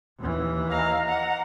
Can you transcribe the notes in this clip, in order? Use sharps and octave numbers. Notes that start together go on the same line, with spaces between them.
D#2 E3
D#5 F5 A#5
F#5